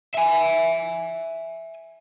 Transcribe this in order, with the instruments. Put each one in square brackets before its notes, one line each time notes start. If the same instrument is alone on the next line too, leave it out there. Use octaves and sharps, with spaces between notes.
[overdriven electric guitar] E5 G#5